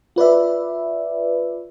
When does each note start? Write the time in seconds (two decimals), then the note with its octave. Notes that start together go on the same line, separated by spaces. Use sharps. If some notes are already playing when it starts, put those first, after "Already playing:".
0.16 F4 B4 D5 E5